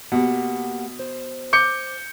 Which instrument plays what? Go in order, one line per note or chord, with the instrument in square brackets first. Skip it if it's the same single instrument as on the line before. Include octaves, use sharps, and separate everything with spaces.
[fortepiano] B2 [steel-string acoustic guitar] A#3 G4 F#5
[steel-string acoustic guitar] C5
[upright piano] D6 G6 C#7